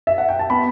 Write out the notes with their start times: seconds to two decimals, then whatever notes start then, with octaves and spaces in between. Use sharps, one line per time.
0.07 E5
0.18 F#5
0.29 G5
0.39 A5
0.50 B3 B5